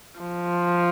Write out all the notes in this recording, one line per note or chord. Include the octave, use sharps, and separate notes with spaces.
F3